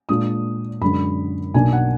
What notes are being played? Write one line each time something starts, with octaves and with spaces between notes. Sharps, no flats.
A#2 G#3 D4 F4 D#6
F#2 D3 G#3 B5
B1 B2 A#3 D4 G#5
F#5